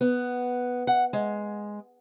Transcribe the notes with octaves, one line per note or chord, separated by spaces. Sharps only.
B3
F#5
G#3